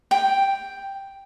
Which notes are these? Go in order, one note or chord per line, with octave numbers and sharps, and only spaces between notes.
G5